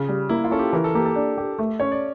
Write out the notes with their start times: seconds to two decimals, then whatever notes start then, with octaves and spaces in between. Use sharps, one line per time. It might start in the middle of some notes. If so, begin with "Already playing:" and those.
Already playing: C#3 F4
0.09 G3
0.29 A#3 E4
0.44 F4
0.51 C#4 A4
0.59 G4
0.73 E3 A#4
0.84 A4
0.94 A#3 G4
1.06 A4
1.16 D4
1.38 G4
1.59 A3
1.80 C#4 C#5
1.92 D5